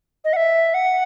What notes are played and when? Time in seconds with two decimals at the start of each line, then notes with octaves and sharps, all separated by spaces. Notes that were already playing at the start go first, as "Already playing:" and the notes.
0.24 D#5
0.33 F#5
0.36 E5
0.74 F#5